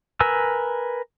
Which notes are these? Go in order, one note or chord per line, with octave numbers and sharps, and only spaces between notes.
A#4 B4 G#5 E6